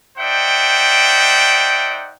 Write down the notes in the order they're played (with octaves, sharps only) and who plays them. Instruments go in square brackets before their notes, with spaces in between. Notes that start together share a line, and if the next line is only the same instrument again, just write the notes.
[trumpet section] D#4 C5 D5 E5 F#5 G5